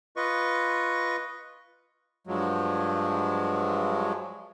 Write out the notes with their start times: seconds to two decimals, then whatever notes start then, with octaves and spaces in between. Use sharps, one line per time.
0.16 F4 B4 D#5 C#6
2.27 G2 F3 F#3 G#3